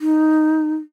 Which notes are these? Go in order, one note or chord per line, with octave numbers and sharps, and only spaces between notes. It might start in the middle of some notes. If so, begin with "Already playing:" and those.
D#4